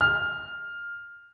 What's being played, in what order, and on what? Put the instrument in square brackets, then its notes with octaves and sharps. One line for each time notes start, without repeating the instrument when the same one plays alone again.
[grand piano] F6